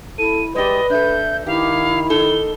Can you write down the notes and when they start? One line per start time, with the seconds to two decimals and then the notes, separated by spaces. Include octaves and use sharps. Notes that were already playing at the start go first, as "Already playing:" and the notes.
0.18 E4 A4 D#7
0.55 G#3 G4 B4 D5 D#5
0.90 D4 A4 E5 G6
1.47 D#3 E4 G4 F5
2.10 D#4 A4 G7